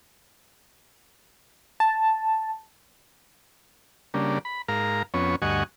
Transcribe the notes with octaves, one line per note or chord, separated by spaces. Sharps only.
A5
C#3 G3 A#3 D4
B5
G#2 A#4 F5 A#5
F2 B3 C#4 C#5
D2 G2 D#5 F#5 G#5 C#6